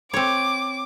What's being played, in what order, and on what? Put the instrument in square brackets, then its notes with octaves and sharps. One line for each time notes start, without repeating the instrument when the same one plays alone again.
[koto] C4 C#5 [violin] D6